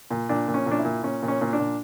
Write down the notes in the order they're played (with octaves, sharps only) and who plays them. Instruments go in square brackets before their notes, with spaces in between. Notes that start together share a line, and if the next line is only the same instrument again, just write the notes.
[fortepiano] A#2
A#2 D4
A#2
C#4
A#2
D4
E4
A#2
A#2 C#4
A#2
C#4
A#2 C#4
D4
A#2